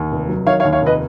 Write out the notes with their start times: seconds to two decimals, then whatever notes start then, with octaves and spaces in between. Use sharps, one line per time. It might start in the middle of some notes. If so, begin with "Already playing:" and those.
Already playing: D#2
0.12 F1
0.28 F#3
0.46 D#3 C#5 F5
0.60 C#5 F5
0.64 D#2
0.73 C#5 F5
0.82 F1 B4 D#5